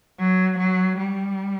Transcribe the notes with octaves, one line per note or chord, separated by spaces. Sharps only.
F#3
F#3
G3